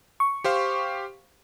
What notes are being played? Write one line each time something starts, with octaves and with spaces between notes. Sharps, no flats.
C#6
G4 C5 F5